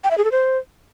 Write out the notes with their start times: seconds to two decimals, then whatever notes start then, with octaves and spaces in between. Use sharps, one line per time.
0.04 G5
0.11 E5
0.18 G#4
0.25 A4
0.31 C5